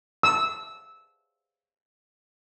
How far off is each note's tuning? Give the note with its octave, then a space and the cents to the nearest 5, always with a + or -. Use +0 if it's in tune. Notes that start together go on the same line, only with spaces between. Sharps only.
E6 -15